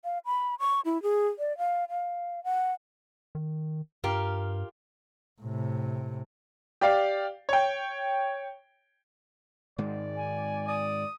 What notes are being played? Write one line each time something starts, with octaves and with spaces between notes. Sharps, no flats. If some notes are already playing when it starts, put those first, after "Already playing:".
F5
B5
C#6
E4
G#4
D5
F5
F5
F#5
D#3
G2 F4 G4 A#4
A2 C3
G4 D5 F5
C#5 G5
G#2 D#3 G#3 D5
G#5
D5 D#6